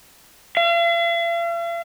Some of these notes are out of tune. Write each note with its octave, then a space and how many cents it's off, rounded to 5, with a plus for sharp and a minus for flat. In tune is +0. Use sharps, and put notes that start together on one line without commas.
F5 -45